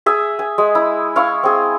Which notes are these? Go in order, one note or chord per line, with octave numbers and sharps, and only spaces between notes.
G#4 E5
G#5
G#3
E4
E4 F5 C#6
C4 G#4